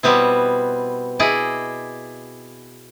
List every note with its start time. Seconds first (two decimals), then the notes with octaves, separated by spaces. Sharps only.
0.03 B2 G3 B3 C4 E4
1.19 E4 G#4 D5 D#5